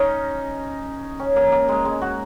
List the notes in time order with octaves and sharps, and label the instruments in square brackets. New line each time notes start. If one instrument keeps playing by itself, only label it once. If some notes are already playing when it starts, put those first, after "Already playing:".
Already playing: [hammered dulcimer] C#4 D#4
C#4
A#3
A#3
G#3
G#3
F#4